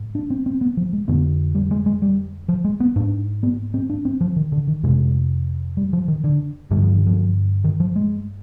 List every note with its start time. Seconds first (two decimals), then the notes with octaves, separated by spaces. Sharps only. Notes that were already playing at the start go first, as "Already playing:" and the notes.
Already playing: G#2
0.15 D4
0.30 C4
0.46 C4
0.61 B3
0.77 F3
0.93 G#3
1.08 F2 D3 B3
1.55 G3
1.71 G#3
1.86 G#3
2.02 G3
2.48 F3
2.64 G#3
2.80 B3
2.96 G#2 D4
3.43 B3
3.74 C4
3.90 D4
4.05 C4
4.21 F3
4.36 D#3
4.52 D3
4.67 D#3
4.83 F2 C3 G#3
5.77 G3
5.93 F3
6.08 D#3
6.24 D3
6.71 G2 D3 G3
6.82 F3
6.95 D#3
7.06 F3
7.64 D#3
7.80 F3
7.96 G#3